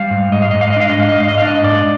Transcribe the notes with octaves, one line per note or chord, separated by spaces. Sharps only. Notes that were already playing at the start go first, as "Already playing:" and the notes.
Already playing: G3 F5
G#2
G#2 D#5
F5
G#2 D#5
F5
D#5
D4 F5
D#5
G#2 F5
D#5
G#2 F5
D#5
D4 F5
D#5
G#2 D5